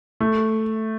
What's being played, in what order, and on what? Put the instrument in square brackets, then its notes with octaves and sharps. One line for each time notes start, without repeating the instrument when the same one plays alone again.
[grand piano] A3